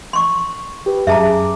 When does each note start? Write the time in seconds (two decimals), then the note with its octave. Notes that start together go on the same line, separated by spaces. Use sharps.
0.13 C6 C#6
0.86 G4 B4
1.07 F#2 G#4 E5 A5 A#5 D6